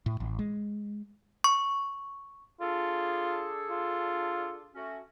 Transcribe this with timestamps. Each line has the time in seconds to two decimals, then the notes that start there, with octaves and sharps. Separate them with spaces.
0.06 A2
0.20 A1
0.39 G#3
1.44 C#6
2.61 D4 F4 G#4 A4
3.70 F4
4.74 A3 C#4 F#4